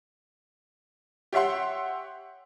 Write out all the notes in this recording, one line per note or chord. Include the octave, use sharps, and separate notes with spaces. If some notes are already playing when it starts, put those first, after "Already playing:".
G4 C#5 E5 F#5 C6